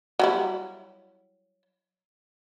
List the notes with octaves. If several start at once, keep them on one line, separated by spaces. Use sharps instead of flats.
F#3 G3 E4